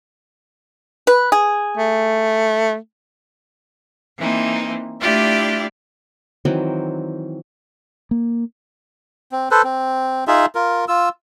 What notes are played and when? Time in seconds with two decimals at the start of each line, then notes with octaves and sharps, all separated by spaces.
1.07 B4
1.32 G#4
1.77 A3
4.17 E3 A#3 C4 D#4
5.01 A3 D4 E4 F4 G4 D5
6.45 D#3 E3 F#3 C4
8.11 A#3
9.32 C4
9.51 A4 B4 C5
9.64 C4
10.27 D#4 F4 G#4 E5
10.55 F4 A#4
10.88 F4 E6